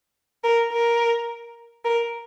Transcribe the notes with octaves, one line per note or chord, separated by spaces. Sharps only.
A#4
A#4
A#4